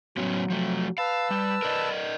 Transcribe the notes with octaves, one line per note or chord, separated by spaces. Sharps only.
A2 F#3 B3 C#4
F3 A3
B4 F5 A5 E6
G3
A#4 D5 D#5